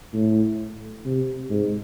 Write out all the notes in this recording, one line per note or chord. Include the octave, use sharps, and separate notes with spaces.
A2
C3
G#2